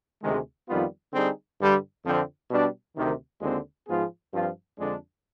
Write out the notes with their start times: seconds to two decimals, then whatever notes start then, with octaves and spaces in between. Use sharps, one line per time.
0.23 D2 C3 D#3 G#3
0.68 F2 D#3 G3 B3 F4
1.13 D3 G3 C4 D#4 G#4
1.59 G2 D3 G3
2.04 F2 D3 F3 C4
2.50 B2 G3 D4
2.96 D2 C3 D#3
3.41 D#2 D3 G#3 C4 F4
3.88 G#2 F3 B3 F4 G#4
4.33 G2 F3 C4 F4
4.79 F2 D3 G#3 D4